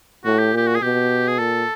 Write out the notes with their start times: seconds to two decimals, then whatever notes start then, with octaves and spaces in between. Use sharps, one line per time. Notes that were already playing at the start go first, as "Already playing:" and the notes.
0.25 A2 F#4
0.39 G4
0.53 A#2 G4
0.68 F#4
0.76 G#4
0.81 B2 G4
1.28 G#4
1.39 A#2 A4